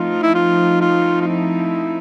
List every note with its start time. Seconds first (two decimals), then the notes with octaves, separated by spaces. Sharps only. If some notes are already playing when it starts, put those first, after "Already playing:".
Already playing: F3 A3 C4 D#4 F4
0.23 E4
0.34 F4
0.81 F4
1.21 F4
1.27 E4